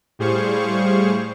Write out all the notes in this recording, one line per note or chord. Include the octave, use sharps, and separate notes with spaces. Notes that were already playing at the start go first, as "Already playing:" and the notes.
A2 G3 G#4 C5 F5 C#6